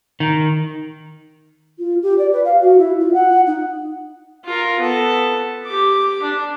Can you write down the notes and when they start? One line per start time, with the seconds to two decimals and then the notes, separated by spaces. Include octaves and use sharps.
0.20 D#3
1.79 F4
2.02 G4
2.18 D5
2.32 B4
2.45 F5
2.61 F#4
2.78 E4
3.00 F4
3.14 F#5
3.47 D#4
4.45 F4 A#4
4.80 B3 A4
5.66 G4 D6
6.23 D4